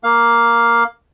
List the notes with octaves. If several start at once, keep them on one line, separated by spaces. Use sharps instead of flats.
A#3 F5